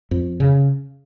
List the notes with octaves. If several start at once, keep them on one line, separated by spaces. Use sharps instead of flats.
F2
C#3